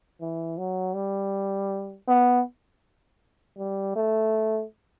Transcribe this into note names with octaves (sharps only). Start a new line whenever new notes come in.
E3
F#3
G3
B3
G3
A3